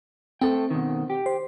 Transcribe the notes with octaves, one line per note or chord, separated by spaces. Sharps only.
A3 C4 A4 G5
B2 D#3
G4
C5